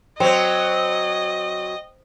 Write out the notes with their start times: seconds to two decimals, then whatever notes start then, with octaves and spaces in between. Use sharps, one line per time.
0.20 F#3 C4 C5 D#5 G5